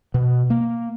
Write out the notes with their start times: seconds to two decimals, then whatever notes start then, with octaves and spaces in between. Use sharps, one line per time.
0.14 B2
0.50 A#3